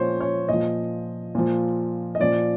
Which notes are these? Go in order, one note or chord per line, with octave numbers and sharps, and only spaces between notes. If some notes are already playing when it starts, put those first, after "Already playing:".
Already playing: A#2 F3 C5 C#5
C#5
A#2 F3 D#5
A#2 F3
D#5
A#2 F3 D5